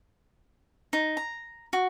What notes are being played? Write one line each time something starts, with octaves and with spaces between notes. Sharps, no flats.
D#4
A#5
F#4